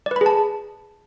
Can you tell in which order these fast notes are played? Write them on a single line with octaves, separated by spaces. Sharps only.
D5 B4 B5 G#4 A5